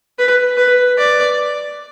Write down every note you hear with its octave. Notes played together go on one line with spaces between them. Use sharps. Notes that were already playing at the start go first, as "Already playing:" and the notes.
B4
B4
D5